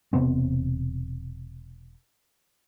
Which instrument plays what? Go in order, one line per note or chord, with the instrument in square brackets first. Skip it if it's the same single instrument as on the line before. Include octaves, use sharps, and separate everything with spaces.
[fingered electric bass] E1 C3 B3 C4